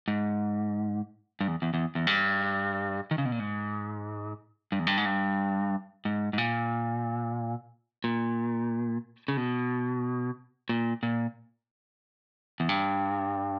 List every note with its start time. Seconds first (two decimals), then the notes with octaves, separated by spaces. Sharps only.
0.08 G#2
1.41 G2
1.48 E2
1.62 E2
1.74 E2
1.95 E2
2.07 G2
3.11 D#3
3.18 C#3
3.25 B2
3.32 A#2
3.40 G#2
4.72 G2
4.79 E2
4.87 G2
4.97 G#2
5.05 G2
6.05 G#2
6.33 G#2
6.38 A#2
8.04 A#2
9.28 C#3
9.37 B2
10.69 A#2
11.03 A#2
12.60 E2
12.69 G2